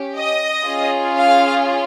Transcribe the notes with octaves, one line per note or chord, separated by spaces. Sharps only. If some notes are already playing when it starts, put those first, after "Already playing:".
Already playing: C#4 G4
D#5
C#4 F4 G#4
F5